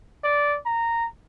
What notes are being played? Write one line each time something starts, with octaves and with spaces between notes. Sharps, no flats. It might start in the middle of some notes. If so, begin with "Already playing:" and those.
D5
A#5